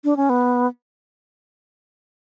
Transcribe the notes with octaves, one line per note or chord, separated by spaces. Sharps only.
D4
C#4
B3